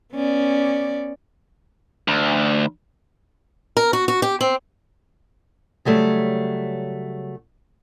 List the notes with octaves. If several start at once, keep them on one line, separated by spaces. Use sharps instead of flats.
B3 C#4 D5
D2
A#4
F#4
F#4
G4
C4
C#3 F#3 G3 A3